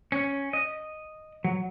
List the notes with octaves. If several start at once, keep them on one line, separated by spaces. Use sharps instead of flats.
C#4
D#5
F#3